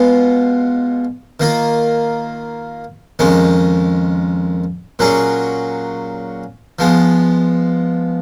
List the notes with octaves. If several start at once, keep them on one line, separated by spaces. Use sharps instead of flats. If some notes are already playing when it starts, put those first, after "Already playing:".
Already playing: B2 G#3 B3 F4
D#3 A#3 F4
F2 D#3 G#3 C#4
A#2 F#3 C#4 G#4
F3 G#3 B3